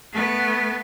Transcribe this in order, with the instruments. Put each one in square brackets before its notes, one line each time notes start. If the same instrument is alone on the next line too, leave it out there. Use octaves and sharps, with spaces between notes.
[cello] A3 B3